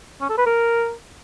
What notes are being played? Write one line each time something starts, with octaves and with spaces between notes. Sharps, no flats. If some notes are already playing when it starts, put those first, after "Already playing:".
C#4
A4
B4
A#4